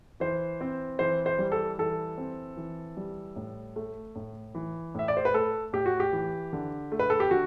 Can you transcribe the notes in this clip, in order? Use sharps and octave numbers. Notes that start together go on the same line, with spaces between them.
E3 C5
C4
E3 C5
C5
G3
A4
E3 A4
C4
E3
G3
A2
A3
A2
E3
A2 E5
D5
C5
B4
A3 A4
A2 G4
F#4
G4
E3
D3
A3
B4
A4
G4
D3 F#4